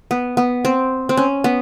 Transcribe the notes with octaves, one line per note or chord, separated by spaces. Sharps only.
B3
B3
C4
C4
C#4
B3